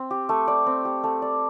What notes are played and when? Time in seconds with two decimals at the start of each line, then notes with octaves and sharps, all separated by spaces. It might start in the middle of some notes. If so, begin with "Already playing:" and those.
Already playing: C4
0.11 G4
0.29 A3
0.48 D5
0.66 C4
0.85 G4
1.04 A3
1.22 D5